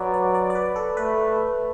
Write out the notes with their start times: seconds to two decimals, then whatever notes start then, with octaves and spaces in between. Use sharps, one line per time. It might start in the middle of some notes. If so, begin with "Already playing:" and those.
Already playing: F#3 B4 D5
0.14 D5
0.34 D5
0.50 D5
0.55 B4
0.76 A4
0.97 A3 B4